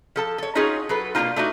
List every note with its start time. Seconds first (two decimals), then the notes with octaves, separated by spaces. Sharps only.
0.16 F3 A4 A5
0.38 A4 C#5
0.55 C#4 D#4 F4 F#4 G#4 C#5
0.89 F#3 A4 B4
1.15 B2 A#3 C4 D4 D#4 F4
1.36 A3 D4 D#4 F#4